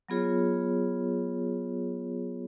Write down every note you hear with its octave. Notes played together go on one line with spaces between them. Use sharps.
F#3 B3 F4 G#4 C#5